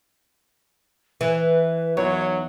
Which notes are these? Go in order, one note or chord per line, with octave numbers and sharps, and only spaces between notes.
E3 B4
E2 F#3 D#4 C#5